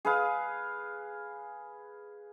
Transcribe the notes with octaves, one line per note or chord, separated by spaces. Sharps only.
G#4 B4 F5